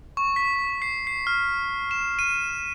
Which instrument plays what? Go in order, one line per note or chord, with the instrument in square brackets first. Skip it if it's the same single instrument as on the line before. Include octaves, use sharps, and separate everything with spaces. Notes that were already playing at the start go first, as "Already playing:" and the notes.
[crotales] C#6
B6
C7
C7
F6
E7
D#7